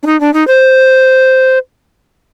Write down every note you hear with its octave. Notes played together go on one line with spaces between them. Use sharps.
D4
D#4
D4
D#4
C5